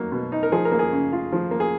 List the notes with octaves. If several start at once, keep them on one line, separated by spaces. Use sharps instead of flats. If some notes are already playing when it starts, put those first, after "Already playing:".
Already playing: F#3 A#3 D#4
B2
D#4
A#4
F3 G#4
A#4
A#3
G#4
C#3
F4
F3
A#3
G#4